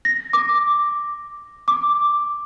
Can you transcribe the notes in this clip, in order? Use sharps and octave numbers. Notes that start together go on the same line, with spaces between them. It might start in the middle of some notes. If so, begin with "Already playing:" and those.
A#6
D6
D6